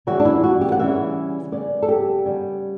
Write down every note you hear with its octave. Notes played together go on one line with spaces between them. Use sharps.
C#3 E3 G3 C#4 F#4
D4
E4
F#4
G4
F#5
C#3 E3 G3 C#4 E5
C#3 G3 B3 D5
A4
G4
C#3 G3 B3